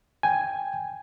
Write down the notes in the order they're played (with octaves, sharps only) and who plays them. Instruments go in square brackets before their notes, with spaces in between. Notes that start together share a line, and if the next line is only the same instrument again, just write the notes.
[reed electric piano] G5 G#5